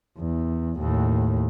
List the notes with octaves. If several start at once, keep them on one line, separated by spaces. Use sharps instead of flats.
E2
D#2 A2